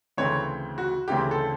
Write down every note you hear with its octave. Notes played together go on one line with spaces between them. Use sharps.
D2 C#3 E3 A3 C4 C#5
F#4
D2 C#3 E3 A3 C4 G4
A4